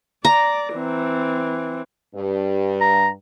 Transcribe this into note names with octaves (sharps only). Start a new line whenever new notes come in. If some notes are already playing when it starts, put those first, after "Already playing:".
D5 A#5
E3 C4
G2
A#5